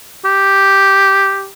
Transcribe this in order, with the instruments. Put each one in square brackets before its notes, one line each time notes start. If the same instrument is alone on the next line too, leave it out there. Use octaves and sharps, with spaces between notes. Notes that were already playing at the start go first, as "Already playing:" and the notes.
[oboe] G4